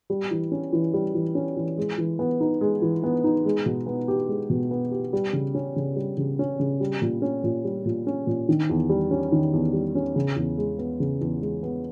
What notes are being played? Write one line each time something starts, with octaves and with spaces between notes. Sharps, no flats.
G3
E3
C#4
E3
G3
E3
C#4
E3
G#3
E3
B3
D#4
G#3
E3
B3
D#4
G#3
B2
B3
G4
G#3
B2
B3
G4
G3
C#3
C#4
C#3
G3
C#3
C#4
C#3
G3
A#2
C#4
A#2
G3
A#2
C#4
A#2
D#3
E2
G3
C#4
D#3
E2
G3
C#4
C#3
E2
G#3
B3
C#3
E2
G#3
B3